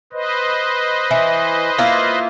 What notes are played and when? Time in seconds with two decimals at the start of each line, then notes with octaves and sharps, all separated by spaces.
0.13 B4 C5 D#5
1.11 E3
1.78 A#3 E4 F4